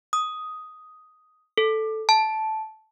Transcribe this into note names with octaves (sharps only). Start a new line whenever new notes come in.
D#6
A4
A5